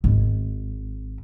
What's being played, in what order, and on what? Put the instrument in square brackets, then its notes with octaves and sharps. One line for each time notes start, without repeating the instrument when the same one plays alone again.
[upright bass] G#1